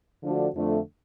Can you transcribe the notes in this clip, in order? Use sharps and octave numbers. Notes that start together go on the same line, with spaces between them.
D3 F3 A3 D4 F#4
F2 D3 F3 A3 D4